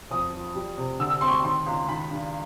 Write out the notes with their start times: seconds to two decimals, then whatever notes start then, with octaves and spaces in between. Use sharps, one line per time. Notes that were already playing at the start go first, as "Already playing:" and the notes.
0.10 F2 D#6
0.33 F3
0.55 G3
0.78 C3
0.99 D3 E6
1.10 E6
1.21 C4 C6
1.28 C#6
1.32 C6
1.44 D#3 C6
1.66 C#2
1.88 D#3 B5
2.11 G2